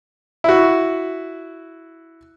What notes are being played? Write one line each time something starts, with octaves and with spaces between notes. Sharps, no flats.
E4 F#4